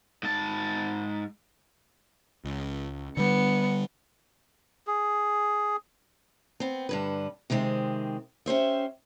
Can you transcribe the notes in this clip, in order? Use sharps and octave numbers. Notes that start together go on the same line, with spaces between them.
G#2 A5
C#2
D3 G3 B3 C#7
G#4
B3 C4
G2 D3 B4
C3 D#3 G#3 C4
C#4 G4 C5 E5